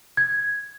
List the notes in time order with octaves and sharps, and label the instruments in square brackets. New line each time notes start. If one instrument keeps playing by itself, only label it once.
[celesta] G#6